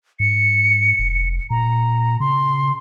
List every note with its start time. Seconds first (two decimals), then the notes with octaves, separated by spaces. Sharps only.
0.20 G#2 C#7
0.99 F1
1.50 A#2 A#5
2.20 C#3 C6